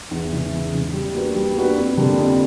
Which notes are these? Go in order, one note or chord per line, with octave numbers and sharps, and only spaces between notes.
E2
C#3 E3 G#3
E2
C#3 E3 G#3
G3
A#3 D4 F#4 B4
G3
A#3 D4 F#4 B4
F2
D3 G3 A#3 D4
F2